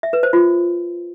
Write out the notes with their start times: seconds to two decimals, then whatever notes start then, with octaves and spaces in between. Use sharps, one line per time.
0.03 E5
0.13 B4
0.23 C5
0.33 F4